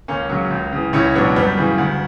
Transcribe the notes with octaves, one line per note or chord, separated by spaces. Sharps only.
C#2 A#3 C#4
C#3 F#3
C#2
C#3 E3
C#2 C#4 E4
B2 F#3 B3 D4
F#2 G3 B3
C#3 E3
D2